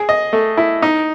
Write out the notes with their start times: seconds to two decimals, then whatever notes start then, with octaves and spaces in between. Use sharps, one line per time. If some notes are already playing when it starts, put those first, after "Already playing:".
Already playing: G#4
0.09 D#5
0.33 A3
0.57 E4
0.82 D#4